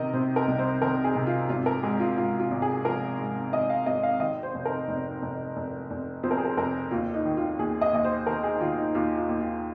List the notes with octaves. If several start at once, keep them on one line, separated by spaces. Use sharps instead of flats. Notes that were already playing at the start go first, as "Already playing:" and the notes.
Already playing: C3 D#3 A#4 D#5
C3 C5
A#4
C2
C5
D#3 A#4
G#4
C3
F4
G#1 F4
A#4
G#2 G#4
F4
G#2 F4
F4
G#1
G#4
F3 A#4
G#2
G#1 D#5
F5
G#1 D#5
F5
D#3 D#5
C5
F1
A#4
F1
F1
F1
F1
F2 C5
A#4
G#4
A#4
F1 A#4
D#2 F4
D#4
D#3
F4
D#2 G#4
D#5
D#2 D#5
C5
D#3 A#4
G#4
D#3 F4
D#4
D#2 F4
F4
D#2
F4